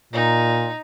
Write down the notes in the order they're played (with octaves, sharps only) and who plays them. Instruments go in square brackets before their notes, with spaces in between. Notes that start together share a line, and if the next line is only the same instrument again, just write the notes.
[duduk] A#2 [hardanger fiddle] D#4